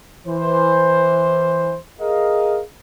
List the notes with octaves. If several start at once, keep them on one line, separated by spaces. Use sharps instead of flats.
E3 C5
G#4 A#4 D#5 F5